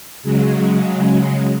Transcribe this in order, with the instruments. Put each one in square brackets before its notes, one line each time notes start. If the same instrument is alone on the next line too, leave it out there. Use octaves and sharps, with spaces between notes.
[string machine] C#3 F#3 G#3